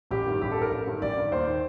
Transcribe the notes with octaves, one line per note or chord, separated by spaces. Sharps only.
A1 G4
G2 D#3
A1 G4
A4
G2 D#3
A#4
A1
G2 D#3
A1 D5
G2 D#3
D#2 C5
D#3